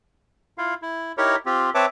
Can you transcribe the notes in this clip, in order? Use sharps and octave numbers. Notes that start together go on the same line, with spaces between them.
E4 F4 F5
E4
D#4 E4 G4 A#4 C#5
C4 F4 G4
C4 B4 C#5 E5 A5 D6